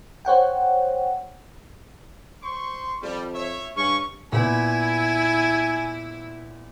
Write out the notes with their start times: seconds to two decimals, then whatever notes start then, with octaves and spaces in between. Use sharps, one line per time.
0.25 C5 C#5 F#5 G5
2.43 C5 C6 C#6
3.03 F2 G3
3.34 C#5 E5
3.76 G2 C#4 C#6
4.32 A#2 B3 E4 G#5